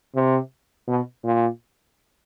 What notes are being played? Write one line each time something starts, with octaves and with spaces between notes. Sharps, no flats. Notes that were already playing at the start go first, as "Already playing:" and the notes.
C3
B2
A#2